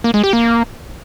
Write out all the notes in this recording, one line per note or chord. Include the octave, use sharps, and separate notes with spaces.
A#3
G#3
G4
A#3